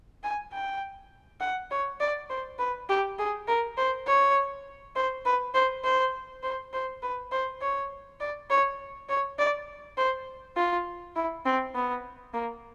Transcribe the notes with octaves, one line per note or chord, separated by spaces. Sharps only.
G#5
G5
F#5
C#5
D5
C5
B4
G4
G#4
A#4
C5
C#5
C5
B4
C5
C5
C5
C5
B4
C5
C#5
D5
C#5
C#5
D5
C5
F4
E4
C4
B3
A#3